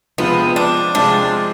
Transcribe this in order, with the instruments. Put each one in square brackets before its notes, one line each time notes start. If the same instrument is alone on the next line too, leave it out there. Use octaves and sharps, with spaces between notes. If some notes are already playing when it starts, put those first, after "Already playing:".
[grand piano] C3 F3 G#3 C4 F4 [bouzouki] B3
[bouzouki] D4
[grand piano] C3 F3 G#3 C4 F4 [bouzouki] D4